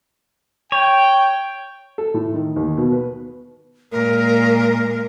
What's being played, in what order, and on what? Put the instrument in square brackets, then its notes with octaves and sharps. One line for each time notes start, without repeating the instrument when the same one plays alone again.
[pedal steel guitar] C#5 [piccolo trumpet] G5
[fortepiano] A4
A2
D#3
D#2
B2
B4
[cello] A#2 G#3 [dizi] A#4